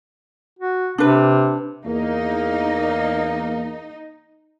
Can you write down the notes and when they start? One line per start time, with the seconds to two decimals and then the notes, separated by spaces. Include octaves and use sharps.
0.59 F#4
0.98 C3 D4 B4
1.86 E2 A#3 D#4